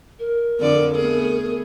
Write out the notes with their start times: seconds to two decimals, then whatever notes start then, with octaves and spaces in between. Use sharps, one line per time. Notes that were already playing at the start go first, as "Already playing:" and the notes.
0.19 A#4
0.59 F2 D3 D5
0.95 A3 B3 G#4